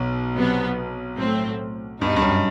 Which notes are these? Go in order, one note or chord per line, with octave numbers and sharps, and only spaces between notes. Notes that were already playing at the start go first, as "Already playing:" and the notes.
Already playing: B1 B2
C3 F#3 B3
A2 F#3 A3 C4
G2 B2 G3 D#4
G2
F#2